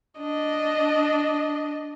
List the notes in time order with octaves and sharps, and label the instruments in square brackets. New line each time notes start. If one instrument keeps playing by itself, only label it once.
[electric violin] D4 D#5